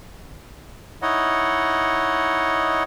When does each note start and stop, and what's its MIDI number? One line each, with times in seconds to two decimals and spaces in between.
1.02 2.83 63
1.02 2.83 64
1.02 2.83 73
1.02 2.83 75
1.02 2.83 78